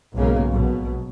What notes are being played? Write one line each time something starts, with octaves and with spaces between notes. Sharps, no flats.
B1 G#2 C#3 G#3 A#3
A#1 B2 F#3